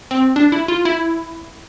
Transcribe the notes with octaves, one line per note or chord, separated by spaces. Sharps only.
C4
D4
E4
F4
E4